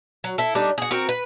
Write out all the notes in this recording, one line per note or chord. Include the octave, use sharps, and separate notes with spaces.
F#3
E4 A4
G3 A3 D4 D#4
F#4 G#4
C4 F#4 A#4
B4